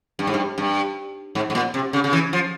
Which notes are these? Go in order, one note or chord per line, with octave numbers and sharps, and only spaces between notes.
G2
G#2
G2
G2
G#2
G#2
A#2
C3
C#3
C#3
E3
F3